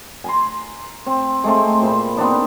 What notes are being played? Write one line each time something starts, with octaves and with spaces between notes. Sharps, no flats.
G#5 A#5 C6
C4
G#3 A3 C4
A#2 C5 B5
B3 C4 D4 D#4